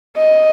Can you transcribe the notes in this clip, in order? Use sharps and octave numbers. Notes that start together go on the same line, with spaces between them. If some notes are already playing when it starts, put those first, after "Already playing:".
D#5